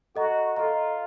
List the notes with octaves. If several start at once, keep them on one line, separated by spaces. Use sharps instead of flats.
F#4 A4 D#5 A#5
F4 A4 D#5 A#5